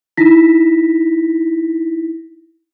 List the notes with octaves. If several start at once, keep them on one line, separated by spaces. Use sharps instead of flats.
D#4 E4 A#6 B6